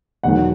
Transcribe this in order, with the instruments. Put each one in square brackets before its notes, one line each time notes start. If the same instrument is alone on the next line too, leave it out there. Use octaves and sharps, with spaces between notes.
[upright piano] E1 E2 D#3 F#3 F#5